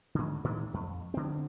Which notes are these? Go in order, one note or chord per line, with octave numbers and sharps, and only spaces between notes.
G#2 D3
A2 D#3 E3 G#3
F2
D3 C4